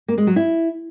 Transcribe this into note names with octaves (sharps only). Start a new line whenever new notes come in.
A#3
G#3
F#3
E4